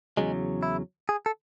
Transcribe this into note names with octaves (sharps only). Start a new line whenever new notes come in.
E2 C#3 F#3 G#3
E4
G#4
A4